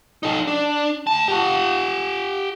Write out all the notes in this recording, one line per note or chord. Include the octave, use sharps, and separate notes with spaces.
D#4 A4
D4
D2 A5
G4 F#5